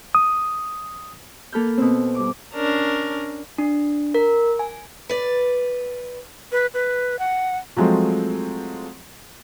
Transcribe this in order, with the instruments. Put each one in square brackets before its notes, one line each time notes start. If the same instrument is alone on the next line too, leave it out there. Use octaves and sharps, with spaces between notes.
[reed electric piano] D#6
[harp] A#3 A4 B5 F6 G6
B2 C4
G2 D6
[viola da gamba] C#4 D4 A#4
[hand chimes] D4
A#4
G#5
[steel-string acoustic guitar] B4 D5
[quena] B4
B4
F#5
[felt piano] F3 F#3 G#3 A3 C4